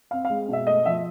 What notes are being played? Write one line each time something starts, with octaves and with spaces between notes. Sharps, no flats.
C4 F5
F5
G#3
B2 E5
A3 D#5
F3 E5